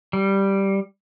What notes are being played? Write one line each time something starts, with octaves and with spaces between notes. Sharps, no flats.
G3